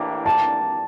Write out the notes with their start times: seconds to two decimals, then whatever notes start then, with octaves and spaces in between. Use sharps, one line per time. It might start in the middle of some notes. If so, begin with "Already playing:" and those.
Already playing: A2 E3 A#3 D4 G4
0.26 A5